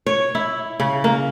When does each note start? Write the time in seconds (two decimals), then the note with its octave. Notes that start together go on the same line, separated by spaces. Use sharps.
0.06 C#5
0.35 E4
0.80 C#3
1.04 A#3